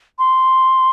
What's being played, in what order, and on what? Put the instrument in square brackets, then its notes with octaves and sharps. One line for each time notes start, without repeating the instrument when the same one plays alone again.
[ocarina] C6